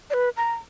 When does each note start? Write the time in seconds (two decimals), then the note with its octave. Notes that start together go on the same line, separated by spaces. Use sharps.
0.10 D5
0.14 B4
0.37 A#5